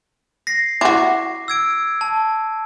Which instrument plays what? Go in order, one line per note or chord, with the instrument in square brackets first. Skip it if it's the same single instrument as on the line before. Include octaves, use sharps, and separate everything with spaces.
[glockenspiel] A#6 C7
[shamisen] E4 F#4 [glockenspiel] D6
[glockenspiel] E6 G#6 D7
A5